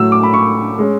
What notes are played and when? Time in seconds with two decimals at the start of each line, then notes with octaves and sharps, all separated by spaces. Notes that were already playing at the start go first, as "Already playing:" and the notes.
Already playing: A2 F#3 A3 E6
0.12 D6
0.23 B5
0.34 C#6
0.79 G#3 C#4